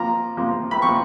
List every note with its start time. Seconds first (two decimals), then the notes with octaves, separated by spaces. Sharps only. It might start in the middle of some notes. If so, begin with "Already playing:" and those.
Already playing: F3 A#3 F4 A#5
0.37 F3 A#3 F4
0.71 B5
0.82 F3 A#3 F4 C#6